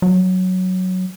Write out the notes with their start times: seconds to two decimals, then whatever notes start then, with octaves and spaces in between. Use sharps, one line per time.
0.02 F#3